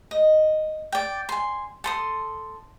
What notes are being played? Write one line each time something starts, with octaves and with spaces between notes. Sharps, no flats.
D#5
D5 G5
G#5 C6
A4 C6 D#6